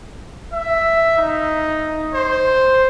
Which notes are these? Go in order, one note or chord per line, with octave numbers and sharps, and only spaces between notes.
E5
D#4
C5